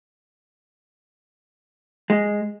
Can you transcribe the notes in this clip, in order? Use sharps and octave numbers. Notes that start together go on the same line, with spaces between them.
G#3